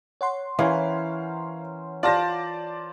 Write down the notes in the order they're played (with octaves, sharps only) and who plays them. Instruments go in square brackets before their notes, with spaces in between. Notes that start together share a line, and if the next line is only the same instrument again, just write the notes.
[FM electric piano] C#5 F#5 C6
[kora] E3 [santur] C#4 A#4 C5 [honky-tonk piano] F5
[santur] F4 C5 [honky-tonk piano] D5 A5 A#6